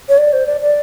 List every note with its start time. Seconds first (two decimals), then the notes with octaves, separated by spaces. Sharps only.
0.09 C#5
0.18 D5
0.33 C5
0.47 D5
0.61 D5